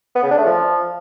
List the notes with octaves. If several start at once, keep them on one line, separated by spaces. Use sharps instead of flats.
B3
C#3
D4
A3
F3